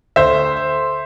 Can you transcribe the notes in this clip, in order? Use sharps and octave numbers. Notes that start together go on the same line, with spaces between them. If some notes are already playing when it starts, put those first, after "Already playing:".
D2 C5 E5